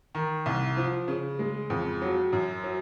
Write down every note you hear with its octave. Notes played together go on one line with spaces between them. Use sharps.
D#3
C2
F3
C#3
G#3
F2
F#3
F#2
F#3